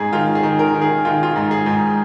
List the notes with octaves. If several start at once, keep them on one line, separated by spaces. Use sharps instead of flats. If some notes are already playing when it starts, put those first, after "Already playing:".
Already playing: G#2 G#4
D#3 F4
G#4
D#3
A#4
D#3
G#4
D#3 F4
F4
G#2
G#4
G#2